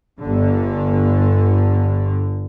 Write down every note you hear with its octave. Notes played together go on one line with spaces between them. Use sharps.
G1 D3